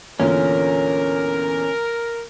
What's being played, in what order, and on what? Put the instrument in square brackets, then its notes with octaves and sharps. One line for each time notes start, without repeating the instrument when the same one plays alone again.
[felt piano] E2 A#2 D3 [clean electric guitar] C#4 [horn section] A#4